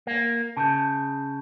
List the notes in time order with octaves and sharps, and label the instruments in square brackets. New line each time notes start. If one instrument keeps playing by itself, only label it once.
[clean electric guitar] A#3
[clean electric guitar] C#3 [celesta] A5 G6